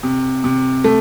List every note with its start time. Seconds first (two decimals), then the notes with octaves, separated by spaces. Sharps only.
0.03 C3
0.44 C3
0.84 A3